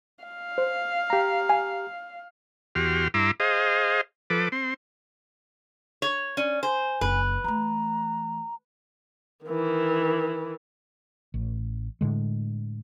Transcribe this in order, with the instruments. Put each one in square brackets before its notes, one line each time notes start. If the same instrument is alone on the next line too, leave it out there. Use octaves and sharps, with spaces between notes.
[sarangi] F5
[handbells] C5
[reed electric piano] G4 A#5
[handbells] G#5
[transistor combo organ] E2 F#4 G4 C6 F6
G2 E4 A#5 C6 D6 E6
G#4 C5 D#5 F5
F3 A4 B4 D6
C4 C6
[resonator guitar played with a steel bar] C#5
[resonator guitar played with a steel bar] C#4 [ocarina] D5
[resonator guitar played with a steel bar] C5 [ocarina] G#5
[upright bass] F#1 [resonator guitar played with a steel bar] B4
[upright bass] E3 A3 [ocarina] A#5
[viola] D#3 E3
[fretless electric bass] A1
A2 D3 G#3